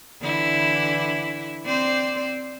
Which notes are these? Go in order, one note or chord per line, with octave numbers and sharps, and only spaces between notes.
D3 E3 E4
C4 C5 D5